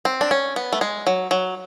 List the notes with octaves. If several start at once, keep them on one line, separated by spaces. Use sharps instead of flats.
C4
D4
C#4
B3
A3
G#3
F#3
F#3